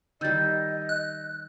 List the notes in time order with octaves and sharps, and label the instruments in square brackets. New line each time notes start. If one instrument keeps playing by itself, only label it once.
[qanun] D#3 G3 [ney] D#5 [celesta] E6 G6 A6
[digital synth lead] F#6